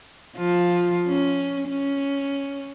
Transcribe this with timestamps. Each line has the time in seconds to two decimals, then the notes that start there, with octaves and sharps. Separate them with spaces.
0.37 F3 F4
1.07 C#4
1.69 C#4